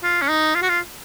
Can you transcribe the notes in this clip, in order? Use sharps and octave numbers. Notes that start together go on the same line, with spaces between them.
F4
C#4
D#4
F4
F#4
F4